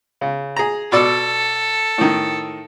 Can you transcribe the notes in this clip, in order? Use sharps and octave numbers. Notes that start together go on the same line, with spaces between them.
C#3
G#4 A#5
B2 A4 D5 E6
A2 D#3